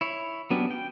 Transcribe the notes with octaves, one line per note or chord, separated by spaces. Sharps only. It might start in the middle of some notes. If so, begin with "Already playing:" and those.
E4 C#5
F#3 B3 C#4 D4 G4
G5